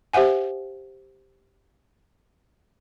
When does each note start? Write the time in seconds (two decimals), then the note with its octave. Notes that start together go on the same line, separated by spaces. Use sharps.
0.13 G4 C5 E5 F#5 G#5